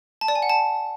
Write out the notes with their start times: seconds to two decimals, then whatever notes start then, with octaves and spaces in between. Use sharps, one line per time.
0.21 A5
0.28 D5
0.35 G#5
0.42 F#5
0.50 A5